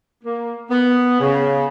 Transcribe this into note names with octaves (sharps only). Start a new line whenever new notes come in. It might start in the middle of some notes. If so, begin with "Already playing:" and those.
A#3
B3
C#3